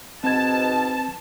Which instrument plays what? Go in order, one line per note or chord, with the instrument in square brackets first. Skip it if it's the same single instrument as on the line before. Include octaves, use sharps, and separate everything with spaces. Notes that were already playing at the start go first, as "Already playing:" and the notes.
[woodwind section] G#2 B2 [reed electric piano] C4 G#6 [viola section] A5